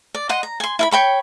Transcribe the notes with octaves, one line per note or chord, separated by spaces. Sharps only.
D5
D#5 F#5 C6
A#5
G#5 C6
E4 F5 B5
C#5 G5 B5 C#6